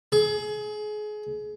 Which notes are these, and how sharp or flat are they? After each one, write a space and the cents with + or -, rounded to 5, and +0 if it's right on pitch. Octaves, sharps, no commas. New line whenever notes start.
G#4 +30